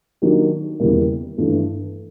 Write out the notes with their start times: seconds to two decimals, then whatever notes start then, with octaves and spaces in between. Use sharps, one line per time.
0.22 D#3 F#3 A#3 D4 G4
0.80 E2 C#3 E3 G3 A#3
1.38 G2 E3 A3